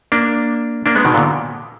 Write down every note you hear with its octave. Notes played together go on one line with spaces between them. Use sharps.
A#3 D4
A#3 D4
G#3 B3
B2 D#3
A#2 D3